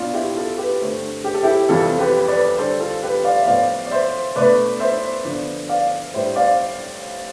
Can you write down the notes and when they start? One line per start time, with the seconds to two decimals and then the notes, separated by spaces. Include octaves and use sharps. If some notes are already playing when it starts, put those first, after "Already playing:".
Already playing: B2 B3 D4 F4
0.14 E4 G4
0.36 F4 A4
0.58 G4 B4
0.80 G2 D3 A3 C4
1.24 G4
1.34 A4
1.43 E4 G4
1.69 F2 C3 E3 G3 F4 A4
1.99 G4 B4
2.28 B4 D5
2.57 D3 G3 D4 A4 C5
2.80 F4 A4
3.03 G4 B4
3.24 D5 F5
3.39 E5
3.46 A2 F3 B3 D5 F5
3.86 D5
3.91 C5 E5
4.36 B2 A3 D4 B4 D5
4.80 C5 E5
5.25 D3 F3 B3 D4
5.69 D5 F5
6.14 A2 G3 D4 C5 E5
6.36 D5 F5